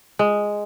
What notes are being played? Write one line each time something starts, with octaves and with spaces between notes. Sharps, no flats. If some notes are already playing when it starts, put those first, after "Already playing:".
G#3